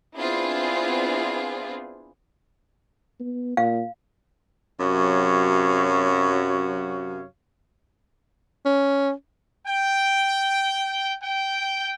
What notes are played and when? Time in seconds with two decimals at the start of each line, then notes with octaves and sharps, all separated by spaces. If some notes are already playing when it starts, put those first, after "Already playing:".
0.17 B3 C4 D4 E4 F4 G#4
3.20 B3
3.57 A#2 F5
4.80 F#2 C3 F#3 F#4 C#5 F5
8.65 C#4
9.67 G5
11.22 G5